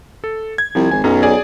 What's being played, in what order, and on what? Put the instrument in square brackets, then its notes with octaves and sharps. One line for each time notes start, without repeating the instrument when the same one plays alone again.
[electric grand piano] A4
G#6
[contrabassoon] C2 [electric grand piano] F3
[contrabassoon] G#1 [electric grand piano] G#5
[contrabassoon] B1 [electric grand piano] F#2 C#4 A#5
[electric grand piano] G#4 D5 G#5